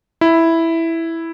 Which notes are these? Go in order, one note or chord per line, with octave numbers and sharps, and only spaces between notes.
E4